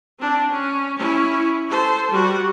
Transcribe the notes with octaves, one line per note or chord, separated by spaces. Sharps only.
C4 D4
C#4
C#4 E4
A4 C5
G3 F#4